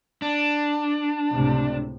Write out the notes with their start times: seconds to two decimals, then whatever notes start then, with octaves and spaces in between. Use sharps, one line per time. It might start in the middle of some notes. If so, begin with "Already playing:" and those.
0.22 D4
1.32 C#2 A2 C3